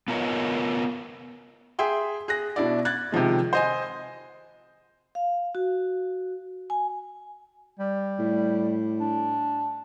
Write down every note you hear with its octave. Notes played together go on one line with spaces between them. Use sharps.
B3 F4 A#4 C#5 D#5
G#4 E5 G5 C6
G#4 F#6 A#6
B2 D4 E4 D5
F#6 G#6 A6
C3 D#3 F3 G#3
C5 D#5 G#5
F5
F#4
G#5
G3
A2
D4